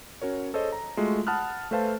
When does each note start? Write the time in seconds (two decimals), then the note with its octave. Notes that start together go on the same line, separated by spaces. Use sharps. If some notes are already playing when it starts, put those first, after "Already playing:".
0.22 C#4 F#4 A#4 C#5
0.53 G#4 A4 C5 C#5 D#5
0.72 A#5
0.97 G#3 A3 F4 F#4
1.27 F#5 A5 B5 D#6 F6 F#6
1.71 A3 A4 B4 C5 F5 A5